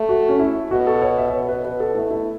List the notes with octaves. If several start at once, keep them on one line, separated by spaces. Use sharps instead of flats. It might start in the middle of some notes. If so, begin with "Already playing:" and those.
Already playing: A3
F#4
C#4
E4
B2 F#4
A4
C#5
E5
E5
B2 C#5
B4
B4
A4
A3 E4
E4